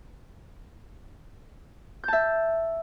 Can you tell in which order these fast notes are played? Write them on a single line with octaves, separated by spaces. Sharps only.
G6 A5 E5